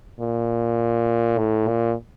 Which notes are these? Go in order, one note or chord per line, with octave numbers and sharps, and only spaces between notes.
A#2
A2
A#2